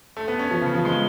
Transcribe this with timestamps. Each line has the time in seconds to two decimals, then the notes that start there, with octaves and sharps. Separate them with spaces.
0.17 A3
0.28 B3
0.39 C#4
0.51 F3
0.62 C#3
0.74 F3
0.85 G#3